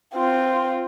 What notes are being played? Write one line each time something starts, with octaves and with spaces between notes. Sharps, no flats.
C4 F4